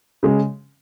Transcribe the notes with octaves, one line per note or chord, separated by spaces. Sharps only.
C#3 G#3